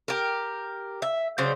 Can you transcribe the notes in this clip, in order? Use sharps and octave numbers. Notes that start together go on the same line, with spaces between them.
G4 A#4
E5
C#3 F#3 C5 D5